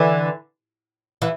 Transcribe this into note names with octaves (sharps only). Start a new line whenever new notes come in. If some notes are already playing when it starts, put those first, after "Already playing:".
Already playing: D3 E3
E3